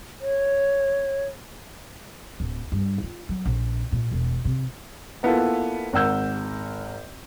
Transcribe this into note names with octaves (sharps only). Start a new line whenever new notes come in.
C#5
D1
G2
F4
F#3
A#1
A#2
E1
C3
A#3 B3 E4 F4 A4 B4
G#1 A#4 F#5 E6 G6